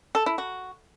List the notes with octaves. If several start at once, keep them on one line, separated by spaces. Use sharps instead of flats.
A4
E4
F#4